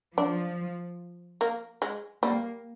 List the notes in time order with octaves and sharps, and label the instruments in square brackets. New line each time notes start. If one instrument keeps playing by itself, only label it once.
[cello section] F3 [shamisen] D4
[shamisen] A#3
G#3
[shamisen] G3 [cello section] A#3